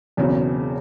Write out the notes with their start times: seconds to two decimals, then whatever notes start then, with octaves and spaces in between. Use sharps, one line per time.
0.17 E1 E2 C#3 F#3 C4